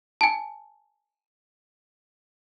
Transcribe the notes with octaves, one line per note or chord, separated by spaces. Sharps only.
G#5 A5